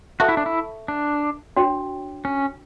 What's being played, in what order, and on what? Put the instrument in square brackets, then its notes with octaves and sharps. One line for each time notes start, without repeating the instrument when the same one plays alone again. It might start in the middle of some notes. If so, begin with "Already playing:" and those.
[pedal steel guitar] F#4 [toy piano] A4 E5 A5 C#6
[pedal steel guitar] E4
D4
E4
D4
[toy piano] D4 F#4 C#5 G5
[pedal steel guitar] C#4